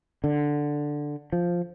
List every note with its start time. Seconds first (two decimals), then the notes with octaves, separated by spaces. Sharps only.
0.24 D3
1.33 F3